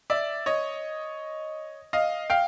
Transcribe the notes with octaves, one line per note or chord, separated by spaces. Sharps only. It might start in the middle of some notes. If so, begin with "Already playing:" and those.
D5 E5
C#5 D#5
D#5 F5
F5 G5